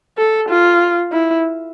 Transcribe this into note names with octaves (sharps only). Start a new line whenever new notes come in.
A4
F4
E4